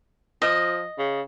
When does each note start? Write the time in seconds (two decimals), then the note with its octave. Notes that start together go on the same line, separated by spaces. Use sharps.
0.42 F3 D#5
0.99 C#3